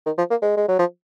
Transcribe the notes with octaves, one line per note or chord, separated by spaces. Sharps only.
D#3
F3
A#3
G#3
G#3
F#3
F3